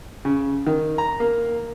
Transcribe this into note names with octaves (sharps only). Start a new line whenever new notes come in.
C#3
D#3
A#5
A#3